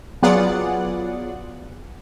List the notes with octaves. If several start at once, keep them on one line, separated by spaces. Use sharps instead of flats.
F#3 B3 F4 G#4 D5 F#5